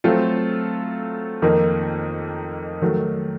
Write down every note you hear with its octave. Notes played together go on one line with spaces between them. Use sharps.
F#3 A3 C4 F4 A4
F2 D#3 A#3 D#4
D#3 F#3 A3